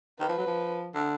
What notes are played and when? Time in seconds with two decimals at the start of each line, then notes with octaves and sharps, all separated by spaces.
0.20 D#3 B4
0.29 F3
0.38 F#3
0.47 F3
0.94 D3